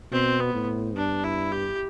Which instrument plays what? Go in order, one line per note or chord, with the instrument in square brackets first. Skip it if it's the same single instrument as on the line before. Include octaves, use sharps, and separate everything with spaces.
[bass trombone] B2 [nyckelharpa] C4
[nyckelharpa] B3
[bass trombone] A2
[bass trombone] G2 [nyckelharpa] D4
[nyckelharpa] E4
G4